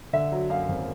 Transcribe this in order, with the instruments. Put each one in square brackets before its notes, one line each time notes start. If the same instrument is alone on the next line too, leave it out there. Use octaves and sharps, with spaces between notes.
[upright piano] D3 E5
F#3
F#2 F5
G#1